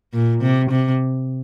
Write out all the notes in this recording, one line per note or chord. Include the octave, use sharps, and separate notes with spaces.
A#2
C3
C3